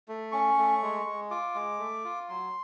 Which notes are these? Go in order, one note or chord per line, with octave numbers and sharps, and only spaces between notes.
A3
C#4 C#6
A3
G#3
G#3
F4 D6
G#3
A3
F4
F#3 C6